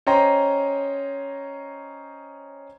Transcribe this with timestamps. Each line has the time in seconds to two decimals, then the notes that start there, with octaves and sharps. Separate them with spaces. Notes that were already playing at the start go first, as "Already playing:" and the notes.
0.07 C#4 C5 D#5 G5 A#5 C6